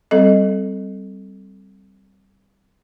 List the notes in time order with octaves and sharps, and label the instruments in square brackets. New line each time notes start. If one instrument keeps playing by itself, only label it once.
[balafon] G3 C4 A4 D#5